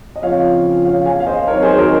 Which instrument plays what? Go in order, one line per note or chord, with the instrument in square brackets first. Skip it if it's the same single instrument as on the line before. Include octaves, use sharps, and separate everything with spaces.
[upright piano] D#5
[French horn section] C#3 F3 C4 F4 [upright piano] C#5 F5
[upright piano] C#5 F5
F5 G#5
F5
C5 D#5
[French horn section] D#3 F#3 C4 D#4 [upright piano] A#4 C#5
[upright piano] G#4 C5
C5
F#4 A#4